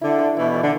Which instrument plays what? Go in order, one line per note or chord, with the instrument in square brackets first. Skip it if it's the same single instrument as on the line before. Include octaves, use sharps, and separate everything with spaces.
[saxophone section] D3 [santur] E4
[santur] A4 D5
[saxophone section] B2 E3 [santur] E4
[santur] A4 D5
[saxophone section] D3